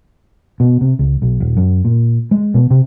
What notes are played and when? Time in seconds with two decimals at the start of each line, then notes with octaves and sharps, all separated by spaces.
0.60 B2
0.81 C3
0.99 C#2
1.22 B1
1.40 D#1
1.57 F#2
1.85 A#2
2.31 G#3
2.54 B2
2.70 C3